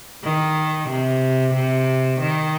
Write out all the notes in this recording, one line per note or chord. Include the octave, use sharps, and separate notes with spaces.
D#3
C3
C3
D#3